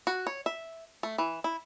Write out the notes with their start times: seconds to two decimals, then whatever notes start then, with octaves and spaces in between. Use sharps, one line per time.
0.07 F#4
0.27 C#5
0.46 E5
1.03 A3
1.18 E3
1.44 E4